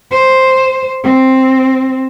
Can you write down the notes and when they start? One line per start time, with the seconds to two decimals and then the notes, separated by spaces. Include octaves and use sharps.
0.11 C5
1.04 C4